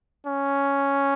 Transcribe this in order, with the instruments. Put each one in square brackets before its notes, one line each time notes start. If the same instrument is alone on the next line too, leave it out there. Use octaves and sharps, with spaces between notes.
[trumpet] C#4